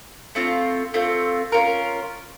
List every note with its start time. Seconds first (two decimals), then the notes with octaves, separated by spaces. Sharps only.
0.35 A3 C4 F4
0.94 A3 C4 F4
1.52 C#4 F4 A#4